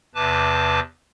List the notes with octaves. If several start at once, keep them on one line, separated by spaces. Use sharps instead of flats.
E2 C3 B4 A5 D6